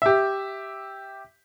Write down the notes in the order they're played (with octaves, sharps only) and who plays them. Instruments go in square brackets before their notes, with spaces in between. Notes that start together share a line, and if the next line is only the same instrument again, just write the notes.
[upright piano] G4 E5